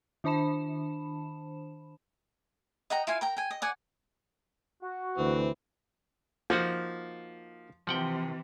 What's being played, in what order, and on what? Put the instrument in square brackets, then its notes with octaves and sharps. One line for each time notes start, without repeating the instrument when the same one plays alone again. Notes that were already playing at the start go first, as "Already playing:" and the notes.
[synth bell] D#3 D4 C5 A5 B5 E7
[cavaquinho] D#5 F#5 G5 A#5
E4 F4 F5 G#5
A#4 G5 A#5
G5 G#5
D#5
D5 F#5 G#5
[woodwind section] F#4
[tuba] D2 [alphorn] E3 [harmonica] C4
[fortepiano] F3 [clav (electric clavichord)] A#3 D#4 F#4
[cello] C3 E3 [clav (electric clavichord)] F3 F#5 G5